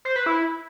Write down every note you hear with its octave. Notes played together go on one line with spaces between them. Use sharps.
C5
B4
E4